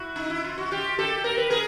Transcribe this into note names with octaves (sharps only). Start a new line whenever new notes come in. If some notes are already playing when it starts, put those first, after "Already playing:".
Already playing: E4 F#4
D#4
E4
F4
F#4
F4 G4
G4 A4
A#4
B4
G#4 A#4